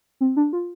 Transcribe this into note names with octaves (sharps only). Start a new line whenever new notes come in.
C4
D4
F4